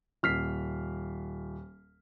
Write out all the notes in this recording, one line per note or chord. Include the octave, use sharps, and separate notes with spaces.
D#1 F6 B6 C7